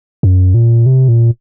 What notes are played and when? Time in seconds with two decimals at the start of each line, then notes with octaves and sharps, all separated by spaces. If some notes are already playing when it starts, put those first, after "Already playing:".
0.23 F#2
0.54 A#2
0.86 C3
1.08 A#2